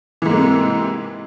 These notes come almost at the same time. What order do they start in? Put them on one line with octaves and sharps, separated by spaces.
E3 G#2 A#3 G#3 C3